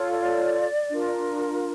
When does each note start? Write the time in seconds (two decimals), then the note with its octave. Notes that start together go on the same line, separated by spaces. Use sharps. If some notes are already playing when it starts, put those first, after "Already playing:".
Already playing: F4 A4 C#5
0.13 D5
0.89 D4 F4 A#4